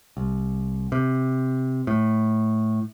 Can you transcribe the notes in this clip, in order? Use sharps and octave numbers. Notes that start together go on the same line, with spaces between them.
C2
C3
A2